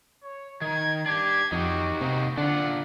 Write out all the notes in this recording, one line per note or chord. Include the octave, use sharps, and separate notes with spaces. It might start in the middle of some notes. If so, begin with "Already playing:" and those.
C#5
D#3 G#6
D4 G4 G#6
F2 D#4 F#4 G4
C3 A#3 C4 D#4
D3 D4 F4 F#5